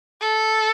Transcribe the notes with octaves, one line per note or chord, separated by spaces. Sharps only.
A4